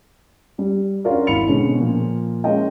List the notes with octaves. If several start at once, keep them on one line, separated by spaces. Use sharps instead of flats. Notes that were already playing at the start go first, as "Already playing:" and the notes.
G3 G4
C#4 D4 F4 F#4 A#4 D5
G#1 E4 B5 C#7 F7
B2 D3 G#3 C4 C#4
A#2 F3
G#3 A#3 C#4 F4 D#5 G5